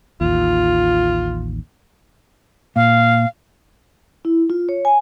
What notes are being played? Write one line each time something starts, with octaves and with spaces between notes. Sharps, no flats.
A1 D#2 F4
A#2 F5
E4
F4
C#5
G#5